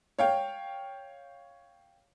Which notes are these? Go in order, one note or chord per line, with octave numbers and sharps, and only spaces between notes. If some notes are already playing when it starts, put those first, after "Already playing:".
C#5 F5 G5